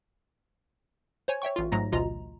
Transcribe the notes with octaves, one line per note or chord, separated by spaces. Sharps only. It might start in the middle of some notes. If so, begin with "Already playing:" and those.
C5 C#5 G#5
C#5 E5 G5 C#6
A1 F4
G#2 F#3 A3 A#5 A#6
A1 D2 B2 F4 D#5 A#5